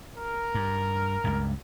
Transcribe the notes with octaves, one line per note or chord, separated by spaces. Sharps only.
A#4
G2
C#2 G2